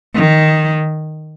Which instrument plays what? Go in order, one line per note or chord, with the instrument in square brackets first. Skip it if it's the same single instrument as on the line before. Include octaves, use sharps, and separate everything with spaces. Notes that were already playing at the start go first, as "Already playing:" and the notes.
[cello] D#3